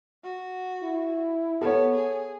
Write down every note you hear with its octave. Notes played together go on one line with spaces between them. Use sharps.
F#4
E4
B3 A4 C#5
G#4